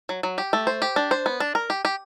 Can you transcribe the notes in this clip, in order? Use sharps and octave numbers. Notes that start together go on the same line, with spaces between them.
F#3
F#3
G4
A3
C5
G4
D4
C5
B3
D4
A#4
G4
G4